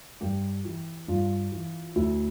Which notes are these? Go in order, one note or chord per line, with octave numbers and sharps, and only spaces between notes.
G2 G4
E3
G2 F4
E3
D2 E4